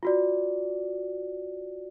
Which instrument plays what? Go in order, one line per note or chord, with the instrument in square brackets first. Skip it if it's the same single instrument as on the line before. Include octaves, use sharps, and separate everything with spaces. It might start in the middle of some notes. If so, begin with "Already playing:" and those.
[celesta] F4 F#4 D5